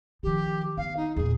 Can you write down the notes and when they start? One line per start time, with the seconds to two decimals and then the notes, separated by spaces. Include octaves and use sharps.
0.23 D#3 F3 G4
0.77 D#3 B3 F5
0.97 D#4
1.17 E2 A#2 G#4